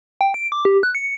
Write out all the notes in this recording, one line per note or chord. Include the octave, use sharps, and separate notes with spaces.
G5
D7
D6
G4
F#6
C#7